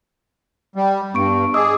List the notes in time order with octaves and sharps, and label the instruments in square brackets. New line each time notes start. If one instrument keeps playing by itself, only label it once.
[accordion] G3
[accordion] G2 [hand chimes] B3 C#6 D7
[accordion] G#4 [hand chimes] D#5 D6 E6